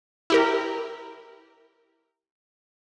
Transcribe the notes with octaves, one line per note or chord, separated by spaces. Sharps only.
E4 G4 A#4